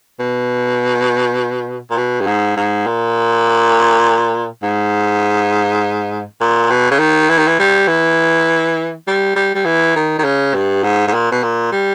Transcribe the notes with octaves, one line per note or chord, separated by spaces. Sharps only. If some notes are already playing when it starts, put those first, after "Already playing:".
B2
A#2
B2
G2
G#2
G#2
A#2
G#2
A#2
B2
C#3
D#3
E3
D#3
E3
G3
E3
G3
G3
G3
E3
D#3
D#3
C#3
G2
G#2
G#2
A#2
B2
A#2
G3